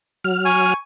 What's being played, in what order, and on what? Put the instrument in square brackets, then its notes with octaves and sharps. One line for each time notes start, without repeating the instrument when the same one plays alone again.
[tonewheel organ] F#3 F6
[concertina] G#5 [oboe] C#6